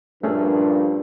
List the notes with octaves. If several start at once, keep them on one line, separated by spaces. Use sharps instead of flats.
G2 A#2 F3 A3 C#4 D4 G#4